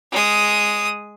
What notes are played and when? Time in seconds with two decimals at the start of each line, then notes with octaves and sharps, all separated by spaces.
0.12 G#3 D#6